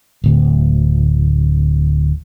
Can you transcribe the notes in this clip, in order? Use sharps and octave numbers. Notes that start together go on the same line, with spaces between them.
D1 D2